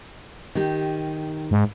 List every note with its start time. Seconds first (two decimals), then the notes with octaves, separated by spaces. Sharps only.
0.55 D#3 G4
1.51 G#2